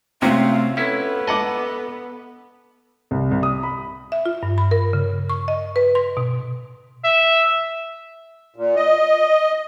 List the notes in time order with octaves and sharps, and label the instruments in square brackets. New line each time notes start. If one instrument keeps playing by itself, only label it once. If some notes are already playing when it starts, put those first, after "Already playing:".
[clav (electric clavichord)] C3 C#4 F#4 [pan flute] A3 [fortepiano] C4 [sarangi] F4
[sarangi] B3 [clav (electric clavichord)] C#4 E4 [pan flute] A4
[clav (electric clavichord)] D#5 F#5 [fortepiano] A5 D6
[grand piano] C2
C2
D#6
B5
[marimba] E5
F4
G2
B5
A#4
C#3
C#6
D#5
B4
C6
B2
[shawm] E5
[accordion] A#2
D#5